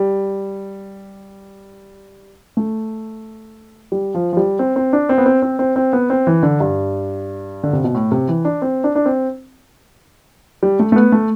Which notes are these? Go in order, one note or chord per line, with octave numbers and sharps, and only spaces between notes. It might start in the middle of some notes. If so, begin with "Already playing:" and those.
Already playing: G3
A3
G3
F3
F3
G3
C4
C4
D4
C4
B3
C4
C4
C4
C4
B3
C4
E3
D3
G2
D3
C3
B2
A2
C3
E3
D4
C4
D4
D4
C4
G3
A3
A3
B3
A3